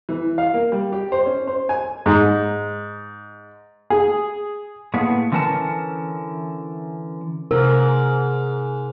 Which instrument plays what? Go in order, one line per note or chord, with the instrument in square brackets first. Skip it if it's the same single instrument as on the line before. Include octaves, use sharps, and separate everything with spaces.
[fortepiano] E3
F5
A#3
G3
G4
C5
C#4
C5
G#5
G#2
G#4
[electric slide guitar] A2 A#3 B3 G#4
D3 E3 C#4 A#4 F#5 A5
[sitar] G#2 [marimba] C3 [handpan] A#4